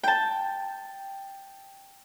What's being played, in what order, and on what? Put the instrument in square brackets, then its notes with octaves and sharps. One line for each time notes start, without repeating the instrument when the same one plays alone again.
[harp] G5 A5